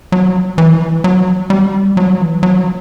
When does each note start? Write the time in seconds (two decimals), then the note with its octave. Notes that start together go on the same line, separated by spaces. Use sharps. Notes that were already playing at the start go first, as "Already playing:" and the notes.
0.12 F#3
0.58 E3
1.04 F#3
1.50 G3
1.97 F#3
2.20 E3
2.43 F#3